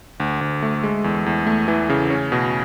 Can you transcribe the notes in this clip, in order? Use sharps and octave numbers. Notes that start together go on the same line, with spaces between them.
D2
D2
A3
G#3
E2
E2
A3
E3
C#3
C#4
B2